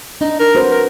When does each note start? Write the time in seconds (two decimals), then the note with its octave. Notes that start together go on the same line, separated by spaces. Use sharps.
0.21 D4 D#4
0.40 A#4
0.55 F#4 B4 C5
0.71 A#4